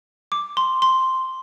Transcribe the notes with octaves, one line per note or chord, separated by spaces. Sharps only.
D6
C6
C6